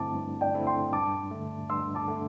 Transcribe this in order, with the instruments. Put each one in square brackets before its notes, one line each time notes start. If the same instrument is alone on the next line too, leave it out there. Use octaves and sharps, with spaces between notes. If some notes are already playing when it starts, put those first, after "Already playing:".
Already playing: [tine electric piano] G2 D3 A3 C4 E4 [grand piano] A5 D6
[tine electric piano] G2
[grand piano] D5 G5
[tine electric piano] D3 A3 C4 E4
[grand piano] G5 C6
[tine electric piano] G2 [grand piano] A5 D6
[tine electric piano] D3 A3
[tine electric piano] G2 [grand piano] C6 E6
[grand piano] A5 D6
[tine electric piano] D3 A3